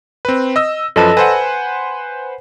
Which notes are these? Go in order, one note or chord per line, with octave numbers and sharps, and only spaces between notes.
C4 B4
D#5 E6
F#2 F3 A4 B4 D#5 A5
B4 C5 F#5 G#5